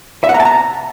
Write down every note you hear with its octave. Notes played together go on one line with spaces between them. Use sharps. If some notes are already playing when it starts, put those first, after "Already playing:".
E5
F#5
A#5
A5
A#5